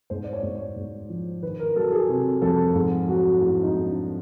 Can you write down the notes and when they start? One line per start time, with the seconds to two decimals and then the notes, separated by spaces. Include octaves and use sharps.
0.10 G#2 C5
0.24 D5
0.33 C#5
0.43 G#2
0.55 C#5
0.76 G#2
1.09 F3
1.43 D#3 B4
1.60 A#4
1.76 F#3 A4
1.92 G#4
2.09 C3
2.42 F2 A4
2.75 G#2 G#4
3.08 F#3 F#4
3.41 G#2 E4
3.63 D#4
3.74 G#2
3.86 D4